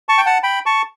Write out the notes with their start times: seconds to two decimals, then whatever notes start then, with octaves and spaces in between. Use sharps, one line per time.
0.09 A5 C#6
0.18 G5
0.26 F#5 A5
0.43 G5 B5
0.66 A5 C#6